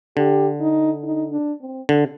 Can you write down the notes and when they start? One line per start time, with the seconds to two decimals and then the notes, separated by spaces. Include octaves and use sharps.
0.17 D3 G4
0.60 D#4
1.04 D#4
1.32 D4
1.61 C4
1.89 D3